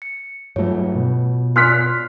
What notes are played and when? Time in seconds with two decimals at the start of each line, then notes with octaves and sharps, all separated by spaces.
0.02 C#7
0.56 G2 F#3 A3 F4 C#5
0.96 B2
1.56 F4 C6 F6 F#6 B6 C7